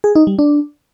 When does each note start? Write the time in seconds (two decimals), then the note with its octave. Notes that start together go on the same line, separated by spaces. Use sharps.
0.04 G#4
0.15 D#4
0.27 G3
0.39 D4